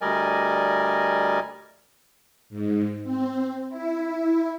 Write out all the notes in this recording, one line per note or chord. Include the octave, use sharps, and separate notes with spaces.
D2 G3 A#4 D5 D#5 G#5
G#2
C4
E4